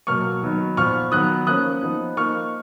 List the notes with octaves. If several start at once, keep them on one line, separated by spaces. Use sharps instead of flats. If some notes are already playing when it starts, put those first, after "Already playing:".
B2 F#3 A#3 C#6 F6
D#3 F#3 B3 D#4
A#2 F3 B3 C#6 F6
D#3 F#3 B3 D#6 F#6
F3 A#3 C#4 D#6 F#6
F3 B3 D#4
F3 A#3 D#4 C#6 F6